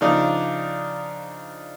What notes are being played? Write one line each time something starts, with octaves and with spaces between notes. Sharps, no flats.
C#3 F3 D4 D#4